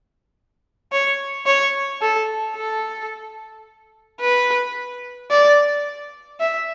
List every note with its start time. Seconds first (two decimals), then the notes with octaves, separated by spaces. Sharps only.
0.92 C#5
1.46 C#5
2.01 A4
2.56 A4
4.20 B4
5.31 D5
6.40 E5